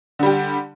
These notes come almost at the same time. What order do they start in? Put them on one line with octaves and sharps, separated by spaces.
D3 G3 G4